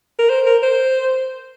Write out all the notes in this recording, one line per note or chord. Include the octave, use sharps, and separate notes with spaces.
A#4
C5
A#4
C5